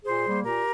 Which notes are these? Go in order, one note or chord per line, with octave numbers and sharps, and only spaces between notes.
A#2 G#4 C5
G3 A#3
A#2 G4 A#4